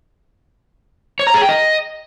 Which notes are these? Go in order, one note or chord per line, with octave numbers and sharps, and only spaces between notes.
C#5
A#5
G#4
G5
D#5